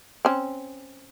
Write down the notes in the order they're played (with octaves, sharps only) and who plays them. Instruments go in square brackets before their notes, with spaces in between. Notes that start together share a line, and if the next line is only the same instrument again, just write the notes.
[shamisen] C4 C#4